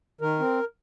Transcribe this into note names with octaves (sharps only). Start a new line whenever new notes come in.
D#3 A#4
C4